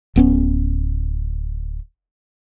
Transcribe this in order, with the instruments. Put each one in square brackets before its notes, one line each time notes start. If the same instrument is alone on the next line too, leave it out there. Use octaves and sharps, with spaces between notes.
[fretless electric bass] D1 B3 C#4